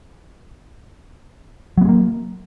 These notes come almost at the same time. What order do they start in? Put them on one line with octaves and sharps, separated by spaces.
F#3 B3 G#3 A#3